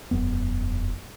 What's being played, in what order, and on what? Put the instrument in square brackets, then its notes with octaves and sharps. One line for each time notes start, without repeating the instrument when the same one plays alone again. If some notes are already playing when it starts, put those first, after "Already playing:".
[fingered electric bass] E1 F#2 B3